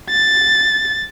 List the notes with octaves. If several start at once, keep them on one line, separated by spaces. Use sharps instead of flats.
A6